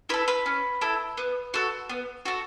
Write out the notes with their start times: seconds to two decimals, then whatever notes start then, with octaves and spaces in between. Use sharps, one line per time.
0.09 E4 A4 B4
0.28 B4
0.46 C#4
0.81 E4 A4
1.18 B3
1.54 F#4 A4
1.89 B3
2.25 F#4 A4